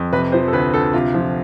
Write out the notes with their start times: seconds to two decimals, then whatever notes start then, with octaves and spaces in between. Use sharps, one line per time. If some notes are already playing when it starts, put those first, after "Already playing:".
Already playing: F2
0.12 C3 B4
0.32 F3 C5
0.48 A4
0.53 D2 B4
0.73 D2 A4
0.93 C3 F4
1.14 F3